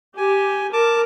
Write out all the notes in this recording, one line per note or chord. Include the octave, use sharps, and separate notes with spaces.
G4 G#5
A#4 A5 D6